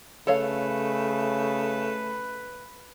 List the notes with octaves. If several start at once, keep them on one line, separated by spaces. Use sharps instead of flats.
C#3 A3 A4 B4 C#5 F5